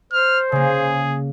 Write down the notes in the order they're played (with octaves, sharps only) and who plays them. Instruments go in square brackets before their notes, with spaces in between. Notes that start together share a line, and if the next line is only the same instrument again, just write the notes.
[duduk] C5 [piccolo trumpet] F6
[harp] C#3 A#3 [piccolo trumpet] G#4